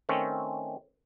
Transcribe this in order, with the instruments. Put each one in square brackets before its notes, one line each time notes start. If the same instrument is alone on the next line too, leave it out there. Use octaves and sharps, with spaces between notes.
[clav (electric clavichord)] D#3 A3 C4 C#4